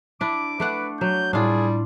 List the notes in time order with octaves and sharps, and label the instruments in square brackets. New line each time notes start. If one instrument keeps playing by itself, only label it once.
[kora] D4 E4 [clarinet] D6
[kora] A3 D4 F#5 [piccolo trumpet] B4
[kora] F#3 [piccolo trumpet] G6
[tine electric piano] A2 E4 [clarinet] G3 [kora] D4 F4 [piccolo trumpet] G#4